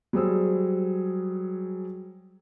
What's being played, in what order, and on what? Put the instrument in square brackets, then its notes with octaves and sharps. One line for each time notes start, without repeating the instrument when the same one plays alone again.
[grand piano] F#3 G3 G#4 C5 D#6 E6